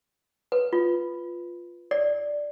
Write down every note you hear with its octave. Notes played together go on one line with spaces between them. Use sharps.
B4
F4
D5